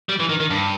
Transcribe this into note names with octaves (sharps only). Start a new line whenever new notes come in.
G3
E3
D#3
D#3
G2